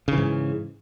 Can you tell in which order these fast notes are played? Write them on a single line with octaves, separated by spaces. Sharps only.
C#3 E3 G#2